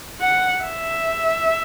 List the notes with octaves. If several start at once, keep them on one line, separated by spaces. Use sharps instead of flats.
F#5
E5